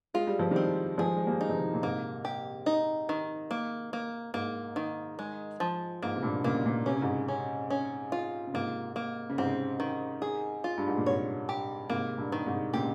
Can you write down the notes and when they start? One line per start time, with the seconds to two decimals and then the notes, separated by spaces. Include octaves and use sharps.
0.14 G#3 F4
0.27 G3
0.39 F3
0.51 D#3 G3 C4
0.98 F3 G#3 G#4
1.17 G#3
1.27 G3 A#3
1.41 D#4
1.49 F3
1.54 C3 D#3
1.74 A#2
1.82 G#2 C3 A#3
2.25 G4
2.66 D#4
3.09 D#3
3.51 A#3
3.93 A#3
4.34 G#2 A#3
4.76 D#3
5.19 G#3
5.60 F3
6.02 G#2 A#3
6.16 C3
6.23 G2 A#2
6.44 A#2 C#3 A#3
6.65 A#2 C#3
6.86 C3 C#4
6.94 C#3
7.02 G#2 C3
7.28 C#4
7.70 C#4
8.12 F4
8.47 C#3
8.54 G#2 C3 A#3
8.96 A#3
9.30 C#3
9.38 G#2 C3 C4
9.80 D#3
10.22 G#4
10.64 F4
10.78 G2
10.88 G#2
10.97 A#2
11.06 G#2 C3 C#5
11.49 G4
11.90 G#2 C3 A#3
12.18 G2 A#2
12.32 D#3
12.46 G#2 C3
12.74 A#2 C#3 G4